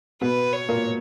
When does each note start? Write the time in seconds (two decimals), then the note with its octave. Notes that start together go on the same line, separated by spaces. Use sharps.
0.21 B2 B3 B4
0.53 C#5
0.69 A#2 A#3